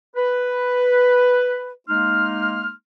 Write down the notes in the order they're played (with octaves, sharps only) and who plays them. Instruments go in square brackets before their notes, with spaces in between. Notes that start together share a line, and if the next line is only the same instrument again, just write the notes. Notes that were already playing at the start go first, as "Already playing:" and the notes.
[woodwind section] B4
G#3 A#3 D#4 C6 F6